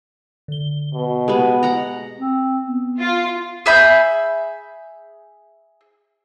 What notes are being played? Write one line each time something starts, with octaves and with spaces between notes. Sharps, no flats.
D3 G7
B2
G#3 B3 G4 G#4
F#5 A#5
C4
B3
F4
G#4 E5 B5 G6